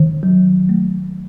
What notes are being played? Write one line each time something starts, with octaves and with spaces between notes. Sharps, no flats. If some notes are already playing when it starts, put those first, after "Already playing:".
Already playing: D#3
F#3
A3